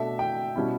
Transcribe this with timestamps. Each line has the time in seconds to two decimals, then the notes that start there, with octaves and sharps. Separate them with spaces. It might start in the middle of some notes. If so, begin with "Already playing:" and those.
Already playing: B2 A3 D4 E5
0.19 G5
0.56 B2 G3 C#4 E4